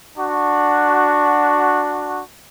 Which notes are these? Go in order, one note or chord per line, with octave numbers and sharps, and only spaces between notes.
D4 F#4